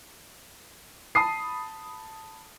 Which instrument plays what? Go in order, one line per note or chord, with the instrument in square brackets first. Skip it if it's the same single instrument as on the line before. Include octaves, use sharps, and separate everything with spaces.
[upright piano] A5 B5 D#6 C7